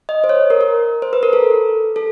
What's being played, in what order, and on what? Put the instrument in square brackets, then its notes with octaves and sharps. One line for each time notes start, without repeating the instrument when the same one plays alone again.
[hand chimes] D#5
C5
C#5
A#4
A#4
C5
B4
A#4
A4
A4